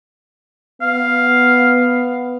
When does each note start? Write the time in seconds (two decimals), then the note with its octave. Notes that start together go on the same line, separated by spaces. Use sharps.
0.81 B3 F5